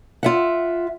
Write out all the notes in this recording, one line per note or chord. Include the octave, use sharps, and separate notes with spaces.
F4 E5 F#5